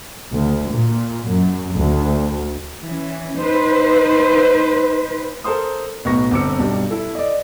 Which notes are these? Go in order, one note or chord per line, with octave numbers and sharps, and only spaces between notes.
D2
A#2
F#2
D2
E3 C#4
D#4 B4 C5
A4 A#4 C5 C6 D#6
B1 A2 B3 C#6 A#6
G1 C4 D6 E6 C#7
B1 G2 G4
E4 A4
D5 D#5